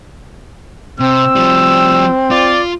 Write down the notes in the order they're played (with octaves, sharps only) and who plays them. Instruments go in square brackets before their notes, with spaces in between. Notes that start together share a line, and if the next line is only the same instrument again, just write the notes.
[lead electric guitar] C3 [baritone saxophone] C4 [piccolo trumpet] E6
[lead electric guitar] F3 G3
[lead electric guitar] F4 [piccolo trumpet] D5